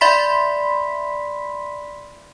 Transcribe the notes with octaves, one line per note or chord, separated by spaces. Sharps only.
D5 E5 B5 C6 B6